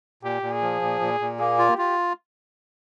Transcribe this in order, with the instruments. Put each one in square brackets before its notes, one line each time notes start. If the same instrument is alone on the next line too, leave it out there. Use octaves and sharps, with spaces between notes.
[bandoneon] A#2 [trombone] G4
[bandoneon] A#2
[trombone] G#4
[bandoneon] F3
A#2
A#2
A#2
[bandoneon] A#3 [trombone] G#4
[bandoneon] F4
[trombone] G4
[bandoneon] F4